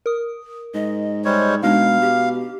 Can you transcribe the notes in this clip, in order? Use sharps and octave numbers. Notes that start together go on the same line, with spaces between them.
A#4 D#6
G#2 D#5
G3 G#3 C5 C#5
B2 G#3 D4 D#4 F5
G4